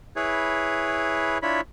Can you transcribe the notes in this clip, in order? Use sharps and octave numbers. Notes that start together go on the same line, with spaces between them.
E4 G#4 B4 C#5
D4 E4 F4 C#5 B5